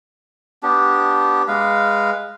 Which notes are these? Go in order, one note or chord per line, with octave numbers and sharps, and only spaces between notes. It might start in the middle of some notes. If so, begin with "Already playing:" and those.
B3 D4 G4
G#3 B4 F5